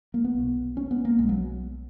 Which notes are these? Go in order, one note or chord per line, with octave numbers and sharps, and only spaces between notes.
A#3
B3
B1 B2
C#4
B3
A#3
B1 B2 G#3
F#3